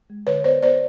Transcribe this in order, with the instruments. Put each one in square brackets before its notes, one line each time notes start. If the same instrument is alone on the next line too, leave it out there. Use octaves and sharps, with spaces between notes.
[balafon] G#3
D3 B4 C#5
B3 C5 D5
B3 C5 D5